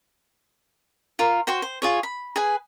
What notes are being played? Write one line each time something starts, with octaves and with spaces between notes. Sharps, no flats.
F4 A#4
F#4 C5 G5 C6
C5
F4 G#4 C#5
B5
G#4 B4 G#5